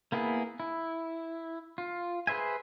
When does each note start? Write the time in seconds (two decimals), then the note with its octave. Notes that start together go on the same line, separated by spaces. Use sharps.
0.12 A#3 B3 E4 G#4
0.60 E4
1.78 F4
2.27 G#4 B4 C5 E5 G#5